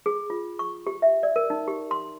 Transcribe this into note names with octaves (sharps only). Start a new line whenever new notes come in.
G#4
F4
C#6
G4
E5
D5
A#4
D#4
G4
C6